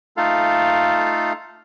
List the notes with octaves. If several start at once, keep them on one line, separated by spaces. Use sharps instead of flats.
A3 D#4 F4 A4 F5